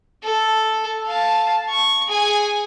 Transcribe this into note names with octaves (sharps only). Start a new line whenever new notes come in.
A4
F5 A5
C#6
G#4 G#5